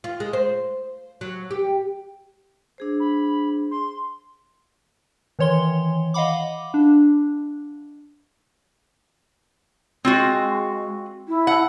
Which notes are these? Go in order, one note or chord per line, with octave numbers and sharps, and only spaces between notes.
F4
G#3
C5
F#3
G4
D4 G#4 C5
B5
C6
D#3 E3 C#5 C6 G7
D#5 F5 F#5 B5 D6
D4
G#3 C4 F4 F#4
E4
F#5